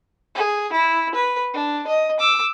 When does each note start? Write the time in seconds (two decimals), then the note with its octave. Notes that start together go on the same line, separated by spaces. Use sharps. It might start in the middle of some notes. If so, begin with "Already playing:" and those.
0.35 G#4
0.72 E4
1.14 B4
1.54 D4
1.87 D#5
2.20 D6 E6